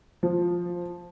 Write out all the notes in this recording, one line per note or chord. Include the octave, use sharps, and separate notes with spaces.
F3